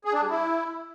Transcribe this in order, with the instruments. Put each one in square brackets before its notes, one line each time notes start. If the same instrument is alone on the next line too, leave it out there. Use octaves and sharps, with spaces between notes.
[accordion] G#4
D4
G3
E4